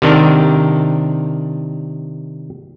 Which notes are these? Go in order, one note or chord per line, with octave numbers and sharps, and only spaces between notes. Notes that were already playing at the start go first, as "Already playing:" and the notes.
C3 D#3 D4 A#4